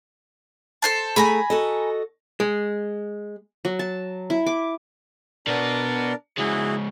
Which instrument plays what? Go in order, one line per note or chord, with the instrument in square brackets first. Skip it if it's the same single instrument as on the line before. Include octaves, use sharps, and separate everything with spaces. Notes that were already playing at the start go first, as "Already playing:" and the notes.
[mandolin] A4 C5 A5
[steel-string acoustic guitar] A3 G#4 [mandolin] G#5 A#5 B5
[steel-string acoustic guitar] F#4 A4 D#5
[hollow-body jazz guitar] G#3
[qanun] F#3
A5
E4
D6
[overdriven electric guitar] B2 B3 [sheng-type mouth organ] D4 A#4 D5
[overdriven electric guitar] G#2 C#3 [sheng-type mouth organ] E4 F#4 G#4